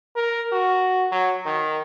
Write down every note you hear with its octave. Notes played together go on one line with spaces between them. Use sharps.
A#4
F#4
F#3
D#3